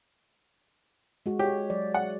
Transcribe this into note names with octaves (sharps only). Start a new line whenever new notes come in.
G#3 F#4
G4 C#5
F#3 D5
F#5